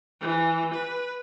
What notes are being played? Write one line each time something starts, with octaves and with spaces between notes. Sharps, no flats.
E3
B4